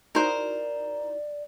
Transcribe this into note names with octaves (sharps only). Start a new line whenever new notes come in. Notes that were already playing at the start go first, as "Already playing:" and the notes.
D#4 E4 F#4 A#4 C5 D5